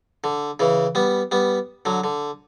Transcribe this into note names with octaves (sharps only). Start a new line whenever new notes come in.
D3
C#3 E3
G3 B3
G3 B3
D3 F#3
D3